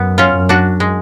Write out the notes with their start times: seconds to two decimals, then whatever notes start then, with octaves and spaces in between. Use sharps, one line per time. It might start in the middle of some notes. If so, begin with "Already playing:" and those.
Already playing: F#2 B3
0.18 C#4 F4
0.34 F#2
0.49 D4 F#4
0.80 G#3